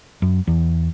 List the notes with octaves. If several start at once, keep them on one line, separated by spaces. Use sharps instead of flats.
F#2
E2